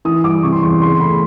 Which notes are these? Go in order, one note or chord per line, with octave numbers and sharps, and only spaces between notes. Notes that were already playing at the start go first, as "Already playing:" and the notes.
E3 D#6
G2 D6
C3 C#6
C6
E2 C#6
C#3 C6
A3 B5